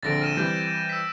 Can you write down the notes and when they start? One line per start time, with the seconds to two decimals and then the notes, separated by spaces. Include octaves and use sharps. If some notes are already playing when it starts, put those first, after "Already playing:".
0.03 A#1 D3 C4 A6 A#6 D7
0.21 F6 D#7 E7
0.37 E3 G3 C4 G6
0.89 E6 B6